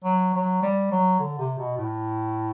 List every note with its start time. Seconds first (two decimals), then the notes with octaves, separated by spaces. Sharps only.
0.04 F#3
0.34 F#3
0.62 G3
0.92 F#3
1.20 D3
1.39 C3
1.58 B2
1.78 A2